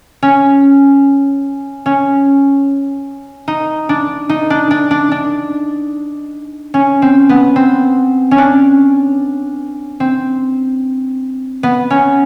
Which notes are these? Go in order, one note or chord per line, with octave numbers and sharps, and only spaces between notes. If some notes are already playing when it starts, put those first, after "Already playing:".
C#4
C#4
D#4
D4
D#4
D4
D4
D4
D4
C#4
C4
B3
C4
C#4
D4
C4
B3
C#4